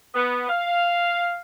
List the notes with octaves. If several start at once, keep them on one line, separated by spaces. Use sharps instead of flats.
B3
F5